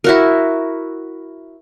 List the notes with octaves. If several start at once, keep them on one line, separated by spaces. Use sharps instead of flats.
E4 F#4 A#4